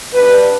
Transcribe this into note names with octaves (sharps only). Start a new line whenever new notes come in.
B2 G3 D4 B4